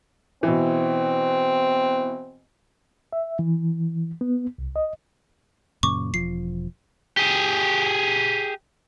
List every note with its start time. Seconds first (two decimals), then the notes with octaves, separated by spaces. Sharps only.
0.43 B2 E3 C4
3.13 E5
3.39 E3
4.21 B3
4.58 C2
4.76 D#5
5.83 F#2 A#2 C#3 C#6 D6
6.14 E1 F3 C7
7.17 G4 G#4